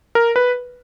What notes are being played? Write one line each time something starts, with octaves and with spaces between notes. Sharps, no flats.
A#4
B4